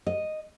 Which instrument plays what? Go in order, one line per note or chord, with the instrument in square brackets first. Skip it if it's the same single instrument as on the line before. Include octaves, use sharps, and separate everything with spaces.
[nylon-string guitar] D#5